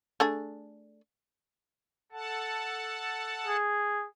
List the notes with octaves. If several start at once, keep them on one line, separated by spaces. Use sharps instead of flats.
A3 D4 G#4
A4 F#5 A5
G#4